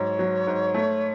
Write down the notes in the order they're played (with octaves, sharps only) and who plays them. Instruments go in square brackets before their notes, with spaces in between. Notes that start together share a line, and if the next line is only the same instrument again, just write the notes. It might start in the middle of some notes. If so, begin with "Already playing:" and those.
Already playing: [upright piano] G#2 F#3 [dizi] C#5
[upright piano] F#3
G#2
A3